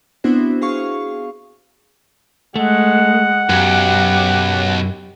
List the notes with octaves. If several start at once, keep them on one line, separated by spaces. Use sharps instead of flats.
B3 C4 D4 E4 F#4 C5
G#4 F5 C#6
G#3 A3 F#5
B1 F#2 G4